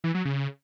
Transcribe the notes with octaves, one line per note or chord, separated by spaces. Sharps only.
E3
F#3
C#3